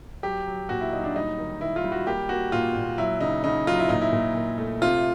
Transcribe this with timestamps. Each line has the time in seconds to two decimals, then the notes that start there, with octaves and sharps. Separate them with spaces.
0.23 F#3 G4
0.47 F#3
0.69 A#2 F#4
0.81 E4
0.92 F#3 D#4
1.04 D4
1.16 G3 D#4
1.38 D#3
1.60 D#3 E4
1.76 F4
1.84 G3
1.92 F#4
2.07 A#3 G4
2.29 A#3 F#4
2.52 A#2 F4
2.75 A#2
2.98 F#3 E4
3.21 C#3 D#4
3.44 C#3 D#4
3.67 F#3 F4
3.79 E4
3.89 A#2 D#4
4.02 E4
4.13 A#2
4.35 A#2
4.58 A3
4.81 C3 F4